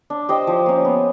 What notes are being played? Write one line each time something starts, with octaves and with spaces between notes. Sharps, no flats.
D4
G4 C5 D#5
F3
A#3 C#4
B3